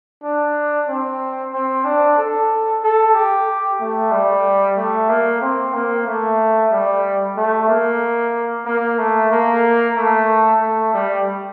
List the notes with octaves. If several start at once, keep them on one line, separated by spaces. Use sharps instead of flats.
D4
C4
C4
D4
A4
A4
G4
A3
G3
A3
A#3
C4
A#3
A3
G3
A3
A#3
A#3
A3
A#3
A3
A3
G3